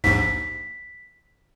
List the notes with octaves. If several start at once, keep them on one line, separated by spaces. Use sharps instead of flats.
A#1 D#2 G#2 B6